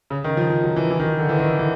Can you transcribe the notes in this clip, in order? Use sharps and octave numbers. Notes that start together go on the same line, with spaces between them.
C#3
D#3
F3
F3
F#3
E3
E3
D#3
D3
E3
D#3
D3
E3